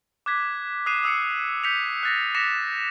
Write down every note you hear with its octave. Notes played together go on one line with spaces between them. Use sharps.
D6 F#6 G#6 B6
D#6 F#6 B6 C7 D#7 E7
D#6 E6 C7 C#7
G6 B6 C#7 F7
F#6 A6 A#6
D6 A#6 B6 C#7 E7 F7